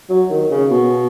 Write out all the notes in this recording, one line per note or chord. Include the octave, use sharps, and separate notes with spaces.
F#3
D#3
C#3
B2